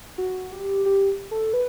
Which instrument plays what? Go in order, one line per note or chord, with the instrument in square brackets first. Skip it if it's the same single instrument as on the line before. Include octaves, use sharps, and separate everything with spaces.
[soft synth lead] F#4
G4
G4
A4
B4